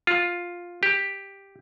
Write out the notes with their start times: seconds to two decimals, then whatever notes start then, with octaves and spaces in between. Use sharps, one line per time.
0.07 F4
0.83 G4